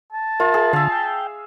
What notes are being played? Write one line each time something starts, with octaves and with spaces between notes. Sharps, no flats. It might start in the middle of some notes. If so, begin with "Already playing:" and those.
A5
F4 A#4 E5
G#4
D3 E5 F5
G5